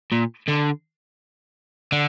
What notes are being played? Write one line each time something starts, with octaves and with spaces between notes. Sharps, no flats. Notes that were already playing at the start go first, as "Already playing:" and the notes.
A#2
D3
D3